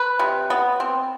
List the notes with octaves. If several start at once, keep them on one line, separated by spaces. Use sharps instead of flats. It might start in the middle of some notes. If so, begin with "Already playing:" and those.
Already playing: B4
C3
B3
C4